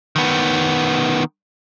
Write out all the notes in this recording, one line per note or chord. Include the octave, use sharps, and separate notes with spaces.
D#3 B3